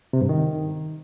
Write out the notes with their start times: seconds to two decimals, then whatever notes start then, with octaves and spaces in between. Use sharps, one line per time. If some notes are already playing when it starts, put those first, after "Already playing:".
0.13 C3
0.21 G2
0.29 D#3